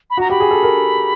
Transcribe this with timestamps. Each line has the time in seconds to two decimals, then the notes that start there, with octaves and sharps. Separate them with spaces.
0.10 B5
0.17 F#4 A#5
0.30 G4 B5
0.40 G#4
0.51 A4
0.63 A#4